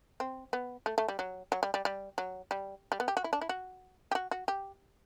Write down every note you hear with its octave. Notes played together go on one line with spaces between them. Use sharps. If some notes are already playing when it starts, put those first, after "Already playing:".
C4
B3
A3
A3
G3
F#3
F#3
G3
G3
G3
F#3
G3
G3
B3
G4
F#4
E4
D4
E4
F#4
G4
F#4
F#4
G4